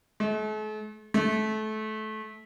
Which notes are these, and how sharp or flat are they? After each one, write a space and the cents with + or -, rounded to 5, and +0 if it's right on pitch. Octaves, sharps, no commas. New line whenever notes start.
A3 -45
A3 -25